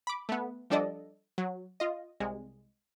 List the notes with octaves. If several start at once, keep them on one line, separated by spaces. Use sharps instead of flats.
B5 D6
A3 B3
F3 G3 D4 A4 D5 D#5
F#3
F4 D#5
C2 G#3